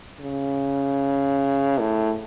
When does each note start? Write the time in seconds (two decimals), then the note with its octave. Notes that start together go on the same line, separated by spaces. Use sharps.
0.21 C#3
1.79 A2